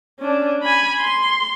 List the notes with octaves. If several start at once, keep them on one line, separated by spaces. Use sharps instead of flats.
C#4 D4
G#5 B5
C6